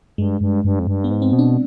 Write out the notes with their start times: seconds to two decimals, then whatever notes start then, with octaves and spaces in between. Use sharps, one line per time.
0.18 G2 G#3
0.41 G2
0.65 G2
0.79 F2
0.87 G2
1.04 B3
1.10 G#2
1.22 C4
1.33 B2
1.39 D4